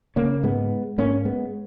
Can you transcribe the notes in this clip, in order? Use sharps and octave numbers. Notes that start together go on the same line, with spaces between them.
C#3 A#3 C#4
G#2 G#3 B3
G#2 A#3 C#4
G#3 B3